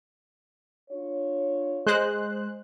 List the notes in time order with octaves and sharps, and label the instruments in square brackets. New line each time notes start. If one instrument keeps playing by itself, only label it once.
[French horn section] D4 F4 C#5
[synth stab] G#3 C5 F#6